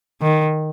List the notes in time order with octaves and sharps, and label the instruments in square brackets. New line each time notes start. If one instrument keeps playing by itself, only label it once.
[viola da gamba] D#3